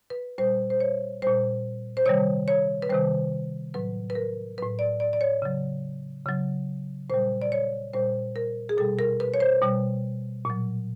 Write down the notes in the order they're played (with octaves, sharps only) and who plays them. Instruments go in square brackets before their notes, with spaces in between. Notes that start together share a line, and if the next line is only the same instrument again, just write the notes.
[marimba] B4
A#2 G3 C5
C5
C#5
A#2 G3 C5
C5
C3 D#3 G3 C#5
C#5
B4
C3 D#3 G3 C5
A2 F#3 B4
B4
A#4
A2 F#3 B4
D5
D5
D5
C#5
C#3 F#3
C#3 F#3
A#2 G3 C5
D5
C#5
A#2 G3 C5
A#4
G#4
B2 G3 A4
A#4
B4
C#5
C5
B2 G3
A#2 F#3